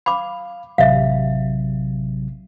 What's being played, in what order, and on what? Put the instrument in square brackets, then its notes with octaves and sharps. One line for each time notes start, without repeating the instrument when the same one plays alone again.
[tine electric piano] F5 [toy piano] B5 D6
[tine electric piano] A1 C3 F#3 [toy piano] E5 F5